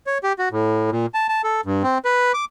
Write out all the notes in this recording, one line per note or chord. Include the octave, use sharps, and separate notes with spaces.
C#5
G4
F#4
A2
A#2
A5
A5
A4
G2
C4
B4
D6